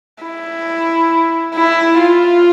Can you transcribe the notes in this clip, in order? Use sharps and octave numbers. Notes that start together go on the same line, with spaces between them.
E4
E4
F4